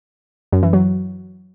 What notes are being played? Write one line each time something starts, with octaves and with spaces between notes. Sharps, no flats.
F#2
E3
F#3